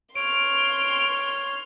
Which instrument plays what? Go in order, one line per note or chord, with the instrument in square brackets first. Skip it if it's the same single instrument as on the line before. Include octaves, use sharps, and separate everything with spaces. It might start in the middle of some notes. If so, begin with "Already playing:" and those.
[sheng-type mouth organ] C#5 [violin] C6 F6 [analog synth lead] D7